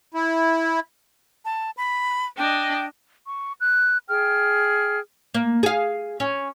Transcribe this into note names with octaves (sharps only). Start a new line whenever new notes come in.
E4
A5
B5
D4 D#5 G5
C#6
F#6
G#4 G5 F6
A#3
G#4 F5
C#4